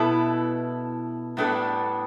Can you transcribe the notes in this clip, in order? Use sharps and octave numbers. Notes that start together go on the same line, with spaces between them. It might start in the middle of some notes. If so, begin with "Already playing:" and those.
Already playing: B2 B3 E4 A4
A2 G3 B3 D4 A4